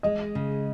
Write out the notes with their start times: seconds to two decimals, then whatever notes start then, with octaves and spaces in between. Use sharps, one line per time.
0.03 G#3 D#5
0.35 C#3